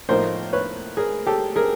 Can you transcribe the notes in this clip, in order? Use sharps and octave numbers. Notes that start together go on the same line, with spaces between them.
A2 F3 A#3 D#4 A#4 C5
B4 C#5
G#4 A#4
G4 A4
G#4 A#4